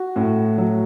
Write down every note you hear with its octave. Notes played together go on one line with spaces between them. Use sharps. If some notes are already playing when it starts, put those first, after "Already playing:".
Already playing: F#4
A2
F#3